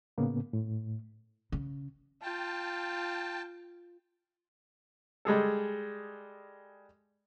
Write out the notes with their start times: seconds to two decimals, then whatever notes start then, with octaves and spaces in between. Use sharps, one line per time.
0.18 A2 C#3 A#3 B3
0.53 A2
1.52 C#3
2.22 F4 G5 A5
5.25 G3 G#3 G#4 A4